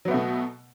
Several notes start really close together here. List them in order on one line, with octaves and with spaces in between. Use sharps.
F#3 B3 A3 B2